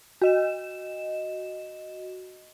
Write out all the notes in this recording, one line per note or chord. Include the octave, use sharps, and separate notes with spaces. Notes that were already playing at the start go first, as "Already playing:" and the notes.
F#4 D#5 E7